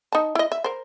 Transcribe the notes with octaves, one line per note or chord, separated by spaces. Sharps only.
D#4 A5
E4 D#5
E5
A#4 C5